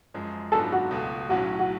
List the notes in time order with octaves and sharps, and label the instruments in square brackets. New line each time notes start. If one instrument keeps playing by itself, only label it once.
[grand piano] F#2 F3 G#3
[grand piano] G#2 F#3 B3 D4 F4 [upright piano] A4
[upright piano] F#4
[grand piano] C#2 B2 A3
[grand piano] B1 A2 F#3 C#4 [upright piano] F#4
[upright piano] F#4